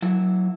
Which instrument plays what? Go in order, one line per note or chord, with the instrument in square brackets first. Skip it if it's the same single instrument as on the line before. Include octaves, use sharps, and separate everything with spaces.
[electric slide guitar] F#3 E4